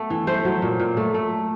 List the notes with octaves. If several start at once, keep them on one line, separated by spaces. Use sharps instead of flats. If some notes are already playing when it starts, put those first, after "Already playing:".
Already playing: A3 B3
E3
A3 C5
F#3
A#2
A#2
A3
A3